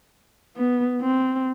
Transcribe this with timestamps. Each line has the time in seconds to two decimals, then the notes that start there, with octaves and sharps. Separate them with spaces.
0.57 B3
1.01 C4